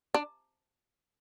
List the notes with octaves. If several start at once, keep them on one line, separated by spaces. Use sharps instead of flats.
D4